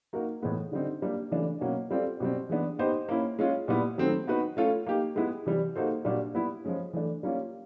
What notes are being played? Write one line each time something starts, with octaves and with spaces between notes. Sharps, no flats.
A#3 D#4 F#4 A#4
A2 E3 G#3 B3
D3 G3 C4 D#4
G3 A#3 D4
C#3 E3 A3 D4
B2 F#3 A#3 C#4 F#4
G3 C4 F4 A4 D5
B2 G3 C4
E3 G#3 B3 D4
B3 D#4 G4 C5 D#5
A#3 C#4 E4
G#3 C#4 F4
A#2 G3 B3 E4
D#3 F#3 A3 C4
B3 D#4 F#4 B4
A3 C#4 F4 A4 C#5
A#3 D#4 G4
G#3 B3 E4
C3 E3 G3
A#3 D#4 F#4 A4 C5
A#2 G3 A#3 D4 F#4
G3 B3 E4
F3 G#3 C#4
E3 A3 D4
G3 A#3 C#4 F4